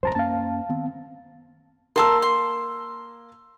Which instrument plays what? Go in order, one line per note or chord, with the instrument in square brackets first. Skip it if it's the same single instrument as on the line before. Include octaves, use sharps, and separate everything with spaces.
[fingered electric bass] D1 C2 F#2 [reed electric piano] C5 A5 A#5
[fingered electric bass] F#2 A#3 C#4 [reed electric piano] F5 A5
[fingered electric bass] D#3 B3 C4
[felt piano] A#3 E6 [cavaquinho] A#4 A5 C6
[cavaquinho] C6